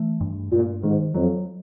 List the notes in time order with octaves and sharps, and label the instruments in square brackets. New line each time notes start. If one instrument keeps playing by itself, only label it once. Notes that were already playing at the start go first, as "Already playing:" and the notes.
Already playing: [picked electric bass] E3 A3
G2
[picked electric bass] G2 [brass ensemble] A#2
[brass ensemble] G#2 [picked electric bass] D#3
[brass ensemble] F2 [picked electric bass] F#3